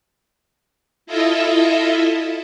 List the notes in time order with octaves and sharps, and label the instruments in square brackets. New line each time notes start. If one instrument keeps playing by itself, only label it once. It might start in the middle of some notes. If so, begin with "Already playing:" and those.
[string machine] E4 F4 A4 D#5 E5